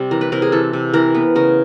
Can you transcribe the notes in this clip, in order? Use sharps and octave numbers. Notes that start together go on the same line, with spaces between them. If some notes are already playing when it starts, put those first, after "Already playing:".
Already playing: C3 G3
E3 A#4
B4
C3 A#4
G#4
E3 A4
C3
E3 A#4
B3
C#3 A#4